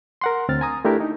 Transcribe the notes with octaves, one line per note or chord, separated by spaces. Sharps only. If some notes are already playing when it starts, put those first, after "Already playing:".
A#4 F#5 C6
D2 C4 F6 A6
G#5 A#5 D#6
A3 D4 E4 G4 A#4
D#4